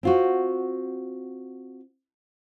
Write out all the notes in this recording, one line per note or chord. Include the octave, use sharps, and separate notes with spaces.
C4 F4 F#4